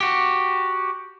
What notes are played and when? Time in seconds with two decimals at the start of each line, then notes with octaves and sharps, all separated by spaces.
0.01 F#4 G4